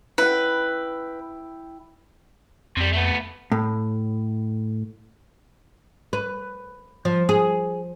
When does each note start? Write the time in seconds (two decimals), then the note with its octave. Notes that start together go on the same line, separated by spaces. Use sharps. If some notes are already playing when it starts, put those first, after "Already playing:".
0.18 E4 B4 G5
2.77 F2 C3 G3
2.93 A3 B3
3.52 A2
6.13 B4
7.05 F3
7.29 G#4